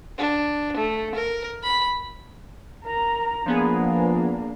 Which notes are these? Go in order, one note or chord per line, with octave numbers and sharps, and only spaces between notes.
D4
A3
A#4
B5
A#4 A#5
F3 A#3 B3 D4 G#4